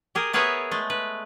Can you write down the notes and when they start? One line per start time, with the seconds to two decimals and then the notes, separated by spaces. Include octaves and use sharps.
0.15 G4 G#4 A#4
0.33 B3 G#4 A#4 B4 C#5 E5
0.71 G#3 A3
0.90 B4